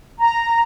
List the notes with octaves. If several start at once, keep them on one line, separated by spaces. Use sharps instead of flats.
A#5